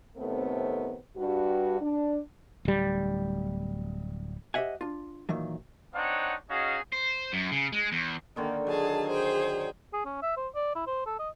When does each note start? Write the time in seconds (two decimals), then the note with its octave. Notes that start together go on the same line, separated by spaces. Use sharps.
0.17 A2 C3 D#3 A3 B3 C4
1.17 G2 F#4
1.81 D4
2.65 D1 G3
4.54 G4 C5 D#5 E5 F#5 G#5
4.81 D4 F4
5.29 A#2 D#3 E3 F#3
5.95 C4 D4 D#4 C#5 F#5
6.50 C#4 D#4 F#4 G#4 D#5 F5
6.93 C5
7.33 F#2
7.51 C#3
7.72 G#3
7.92 E2
8.36 D3 D#3 A#3 D#4
8.67 F#3 G#4 A5
9.08 G#4 C5 G5
9.93 G#4
10.05 C#4
10.22 E5
10.37 C5
10.55 D5
10.75 E4
10.87 C5
11.06 A4
11.19 D#5